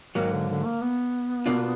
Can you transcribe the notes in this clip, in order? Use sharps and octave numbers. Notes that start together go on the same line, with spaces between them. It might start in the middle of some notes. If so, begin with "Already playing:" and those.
G#2 D#3 F#3 A#3
D3
D3
A#3
B3
B2 A#3 D4 F4